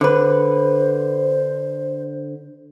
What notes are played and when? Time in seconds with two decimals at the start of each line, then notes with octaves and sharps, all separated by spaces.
0.01 D3 B4 C5